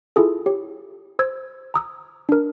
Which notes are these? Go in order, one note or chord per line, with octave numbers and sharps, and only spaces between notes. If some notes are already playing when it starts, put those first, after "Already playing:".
E4 F4 G#4 A4
G4 C#5
C5 E6 G#6
A#5 D#6 E6
D4 A#4